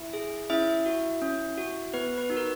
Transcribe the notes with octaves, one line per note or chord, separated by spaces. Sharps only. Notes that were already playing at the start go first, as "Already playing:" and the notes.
Already playing: E4 E5
G#4
C#4 E4 E5
F#4
C#4
F#4
B3 B4
B4
D#4 F#4
A#4